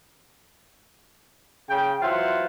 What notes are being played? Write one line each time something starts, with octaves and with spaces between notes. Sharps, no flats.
C#3 G5
E3 F#3 F4 C5 E5 F#5